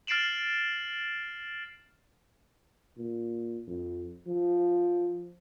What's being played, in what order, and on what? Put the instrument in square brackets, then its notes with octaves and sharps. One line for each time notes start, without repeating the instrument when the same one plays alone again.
[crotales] F6 A6 C7 D7 E7 F#7
[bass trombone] A#2
F2
F3